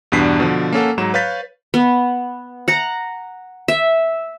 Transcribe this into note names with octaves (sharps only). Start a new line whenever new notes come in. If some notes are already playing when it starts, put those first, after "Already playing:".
E2 G2 B2 D4 B6 C7
B2 D3 F3
A#3 C#4 A4 F#5
G#2 F#3 C#5 A#5 E7
B4 C#5 F5 G6 A6 B6
B3
F#5 A#5
E5